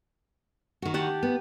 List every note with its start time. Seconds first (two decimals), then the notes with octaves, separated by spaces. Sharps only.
0.82 D#3 F#4
0.94 G4 F#5 A5
1.23 B3